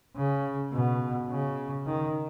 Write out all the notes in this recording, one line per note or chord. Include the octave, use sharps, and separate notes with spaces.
C#3
B2
C#3
D#3